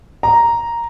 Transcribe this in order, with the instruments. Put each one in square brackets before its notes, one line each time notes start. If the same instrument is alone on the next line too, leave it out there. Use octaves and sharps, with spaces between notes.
[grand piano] A#5